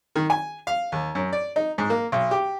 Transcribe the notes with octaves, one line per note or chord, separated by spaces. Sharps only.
D#3
G#5
F5
D#2
F#2
D5
D#4
G#2
A#3
B1
G4